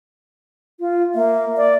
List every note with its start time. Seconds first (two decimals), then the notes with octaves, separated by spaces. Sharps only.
0.80 F4
1.15 A#3 E5
1.57 D5